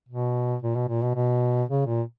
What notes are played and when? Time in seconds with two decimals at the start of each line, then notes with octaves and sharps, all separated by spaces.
0.09 B2
0.62 A#2
0.75 B2
0.88 A#2
1.03 B2
1.15 B2
1.69 C#3
1.86 A#2